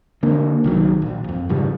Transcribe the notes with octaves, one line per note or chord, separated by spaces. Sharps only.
D3 A#3
C2 D#3 F#3
A#1
F2
G#2 C#3 F3 G3